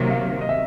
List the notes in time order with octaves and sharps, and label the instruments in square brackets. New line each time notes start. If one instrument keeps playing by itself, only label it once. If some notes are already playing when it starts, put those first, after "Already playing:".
Already playing: [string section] C3 D#3 F#3 A#3 [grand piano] E5
[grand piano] F5
D#5
E5